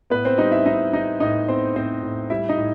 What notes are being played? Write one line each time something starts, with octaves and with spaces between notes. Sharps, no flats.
A2 B3 B4
C4 C5
G3 D#4 D#5
E4 E5
G3 D#4 D#5
G3 D#4 D#5
A2 D#4 D#5
B3 C4 C5
A2 C4 C5
A2
G3 E4 E5
D#4 D#5
A2